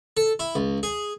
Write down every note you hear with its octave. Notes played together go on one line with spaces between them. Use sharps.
A4
E4
C#2
G#4